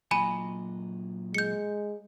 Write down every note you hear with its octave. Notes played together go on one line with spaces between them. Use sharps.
A#2 F#3 D#5 G#5 B5 D#7
G#3 G6 C#7